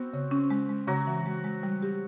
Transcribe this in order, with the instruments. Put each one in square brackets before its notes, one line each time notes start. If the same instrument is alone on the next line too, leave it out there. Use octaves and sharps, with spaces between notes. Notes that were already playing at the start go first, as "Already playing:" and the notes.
Already playing: [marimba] B3 [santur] C4 F#4
[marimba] C#3
C#4
G#3
G#3
[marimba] C#3 [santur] F#3 F#4
[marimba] E3
G#3
G#3
G3
G4